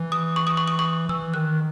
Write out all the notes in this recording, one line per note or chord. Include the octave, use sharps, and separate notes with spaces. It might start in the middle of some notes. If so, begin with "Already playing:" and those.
Already playing: E3
D#6
C#6
D#6
C#6
D#6
C#6
E3 E6
D#3 F#6